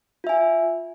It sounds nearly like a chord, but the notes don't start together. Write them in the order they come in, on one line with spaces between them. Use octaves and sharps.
F4 E5 G#5